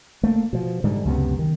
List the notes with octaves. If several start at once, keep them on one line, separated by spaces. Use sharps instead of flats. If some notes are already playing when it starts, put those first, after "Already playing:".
A3 A#3
B2 F3
G#2 D3 G3
C#2 F#2 C3 B3
D#3